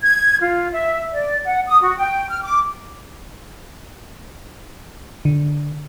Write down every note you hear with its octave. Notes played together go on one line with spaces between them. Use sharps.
G#6
F4
E5
D5
F#5
D#6
F#4
G5
F6
D6
D3